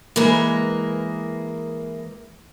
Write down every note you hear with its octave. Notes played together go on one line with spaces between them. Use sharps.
E3 G#3 A#3 A#4 B4